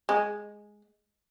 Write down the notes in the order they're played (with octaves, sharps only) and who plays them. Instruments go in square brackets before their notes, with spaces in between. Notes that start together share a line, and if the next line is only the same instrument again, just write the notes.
[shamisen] G#3